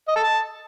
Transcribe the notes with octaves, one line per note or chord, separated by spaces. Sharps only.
D#5
A4
A5